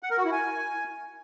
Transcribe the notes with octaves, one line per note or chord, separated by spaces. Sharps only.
F#5
A#4
F#4
E4
G#5